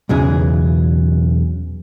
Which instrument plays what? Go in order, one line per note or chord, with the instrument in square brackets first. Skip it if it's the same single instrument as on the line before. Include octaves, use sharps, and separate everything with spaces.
[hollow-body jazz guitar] B1 E2 C#3 E3 G#4